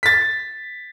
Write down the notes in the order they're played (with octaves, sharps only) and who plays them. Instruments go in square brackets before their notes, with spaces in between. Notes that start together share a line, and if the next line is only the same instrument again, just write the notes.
[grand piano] A6 B6